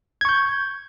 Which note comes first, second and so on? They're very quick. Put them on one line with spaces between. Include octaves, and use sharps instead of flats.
G#6 C#6 G6